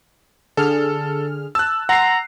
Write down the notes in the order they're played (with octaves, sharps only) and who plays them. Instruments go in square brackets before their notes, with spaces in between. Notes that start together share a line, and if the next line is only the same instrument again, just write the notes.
[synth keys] D3 G#4 F6 [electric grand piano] A4
[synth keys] A5 [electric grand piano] E6 F#6
[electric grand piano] F#5 C7 [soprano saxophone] A#5 [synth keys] C6 A#6